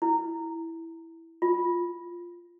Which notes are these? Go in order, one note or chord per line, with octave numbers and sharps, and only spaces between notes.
E4
F4